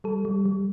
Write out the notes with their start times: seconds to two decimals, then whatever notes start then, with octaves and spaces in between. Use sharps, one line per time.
0.04 G3 A4
0.25 G3
0.45 G3